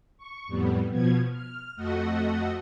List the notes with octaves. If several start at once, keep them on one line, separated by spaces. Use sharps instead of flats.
C#6
F2 A2 G3 B3
B2 F3 B3 G#6
F6
F2 A3 F#4 D#5 F#5